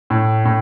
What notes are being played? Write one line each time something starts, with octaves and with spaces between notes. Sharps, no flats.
A2
A2